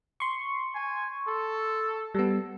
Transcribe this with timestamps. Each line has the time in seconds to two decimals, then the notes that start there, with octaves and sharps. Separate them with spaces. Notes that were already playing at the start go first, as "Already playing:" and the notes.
0.20 C6 C#6
0.75 G#5
1.27 A4
2.15 G3 B3 A4